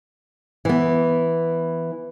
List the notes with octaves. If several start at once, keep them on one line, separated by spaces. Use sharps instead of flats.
E3 B3